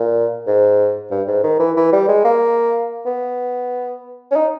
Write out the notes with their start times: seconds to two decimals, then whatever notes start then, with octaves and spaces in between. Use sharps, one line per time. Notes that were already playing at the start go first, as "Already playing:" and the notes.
Already playing: A#2
0.47 G#2
1.11 G2
1.28 G#2
1.44 D#3
1.60 E3
1.77 E3
1.93 G3
2.09 G#3
2.25 A#3
3.06 B3
4.31 C#4
4.36 D#4